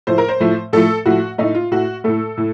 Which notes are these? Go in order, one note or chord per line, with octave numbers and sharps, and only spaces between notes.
A2 F3 A3 C5
A#4
C5
A2 F3 A3
A2 F3 A3 A4
A2 F3 A3 F#4
A2 A3 D#4
F4
A2 A3 F#4
A2 A3 A4
A2